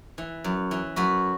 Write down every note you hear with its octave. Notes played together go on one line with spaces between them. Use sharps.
E3
F#2
E3
F#2 F#4 B4